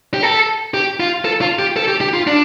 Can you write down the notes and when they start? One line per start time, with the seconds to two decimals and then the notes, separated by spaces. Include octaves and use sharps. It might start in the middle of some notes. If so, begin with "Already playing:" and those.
0.14 G4
0.23 A4
0.74 G4
1.00 F4
1.25 A4
1.41 F4
1.59 G4
1.76 A4
1.88 G4
2.01 G4
2.14 F4
2.27 D4